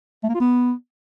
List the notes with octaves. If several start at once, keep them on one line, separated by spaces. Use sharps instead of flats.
A3
A#3
F4
B3